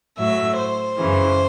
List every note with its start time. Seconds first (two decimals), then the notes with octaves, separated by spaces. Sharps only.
0.18 A2 F#3 E5
0.58 C5
0.98 F#2 C#3 E3